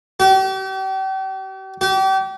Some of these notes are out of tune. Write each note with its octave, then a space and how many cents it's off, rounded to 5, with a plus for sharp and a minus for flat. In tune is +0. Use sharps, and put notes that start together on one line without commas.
G4 -40
G4 -35